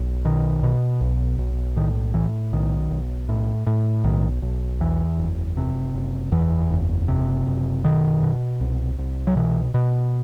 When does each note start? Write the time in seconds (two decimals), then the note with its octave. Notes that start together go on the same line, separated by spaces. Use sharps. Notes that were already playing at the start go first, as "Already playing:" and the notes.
Already playing: B1
0.25 B2 D#3
0.63 B2
1.01 B1
1.38 B1
1.76 A2 D#3
2.14 A2 E3
2.53 B1 D#3
2.91 B1
3.29 A2
3.67 A2
4.04 B1 D#3
4.42 B1
4.80 E2 E3
5.18 F#1
5.57 C3
5.94 F#1
6.32 E2 E3
6.70 F#1
7.08 C3
7.47 F#1
7.84 B2 D#3
8.23 B2
8.60 C2
8.99 C2
9.27 F#3
9.36 B2 E3
9.74 B2